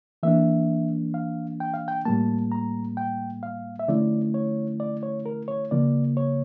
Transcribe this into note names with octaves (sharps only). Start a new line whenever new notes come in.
E3 A#3 D4 E5
F5
G5
F5
G5
A2 G3 A#3 A5
A#5
G5
F5
E5
D3 F3 A3 C#4 E4 D5
C#5
D5
C#5
A#4
C#5
C#3 F3 A#3 D5
C#5